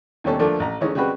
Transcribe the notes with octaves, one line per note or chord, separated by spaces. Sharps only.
D#2 B2 G3 C4 C#4 A4
D3 F3 A3 A#3 D4 A4
A1 A#5
D3 E3 G#3 A3 C#4 D#4
C#3 G3 G#3 C4 F#4 B4